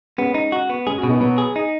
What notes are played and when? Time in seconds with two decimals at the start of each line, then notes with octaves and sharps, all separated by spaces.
0.18 G#3 B3 C#4
0.34 D#4
0.52 F#4
0.70 B3
0.87 G#3 C#4 G#4
0.98 C#4 F#4
1.03 B2
1.09 B3 D#4
1.20 B2 F#3 B3
1.38 G#4
1.56 D#4